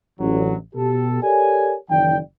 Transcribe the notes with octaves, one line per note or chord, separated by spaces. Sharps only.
A1 D2 F#3
B2 G4 A4
G4 A4 A#4 C#5 D5 G#5
F#1 D#3 E3 D5 G5